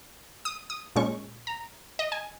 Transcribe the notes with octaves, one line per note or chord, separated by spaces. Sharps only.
D#6
D#6
A#2 G#3 C#4 C#6
A#5
D#5
G#5